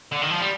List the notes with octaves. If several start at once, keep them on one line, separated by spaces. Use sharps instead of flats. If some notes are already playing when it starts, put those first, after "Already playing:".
D3
D#3
F3
G3